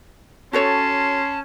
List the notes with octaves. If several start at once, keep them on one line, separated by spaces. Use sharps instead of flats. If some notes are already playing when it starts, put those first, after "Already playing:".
C#4 F#4 A4 C#5 A5 C6